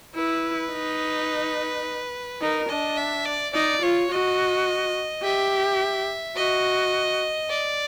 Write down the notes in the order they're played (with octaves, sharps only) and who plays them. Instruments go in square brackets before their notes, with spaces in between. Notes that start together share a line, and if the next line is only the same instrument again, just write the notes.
[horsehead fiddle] E4 [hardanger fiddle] B4
[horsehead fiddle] D#4
[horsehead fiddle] D#4 [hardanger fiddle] A#4
[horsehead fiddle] D4 [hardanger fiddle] D#5
[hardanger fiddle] E5
D5
[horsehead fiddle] D#4 [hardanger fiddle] D5
[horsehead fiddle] F4 [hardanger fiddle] C#5
[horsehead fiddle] F#4 [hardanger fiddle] D#5
[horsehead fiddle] G4 [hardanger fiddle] E5
[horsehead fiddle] F#4 [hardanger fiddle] D#5
[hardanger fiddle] D5